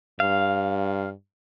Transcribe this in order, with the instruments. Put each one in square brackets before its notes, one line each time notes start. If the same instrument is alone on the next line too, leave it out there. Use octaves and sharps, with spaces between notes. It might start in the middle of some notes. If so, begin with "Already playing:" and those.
[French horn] G2 [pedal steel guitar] F5